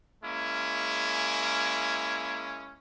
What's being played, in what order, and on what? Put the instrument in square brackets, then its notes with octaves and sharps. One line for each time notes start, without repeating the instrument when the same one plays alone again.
[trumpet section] G#3 A#3 C#4 E4